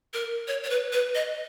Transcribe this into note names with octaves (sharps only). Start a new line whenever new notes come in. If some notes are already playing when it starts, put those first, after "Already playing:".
A#4
C#5
C#5
B4
B4
D#5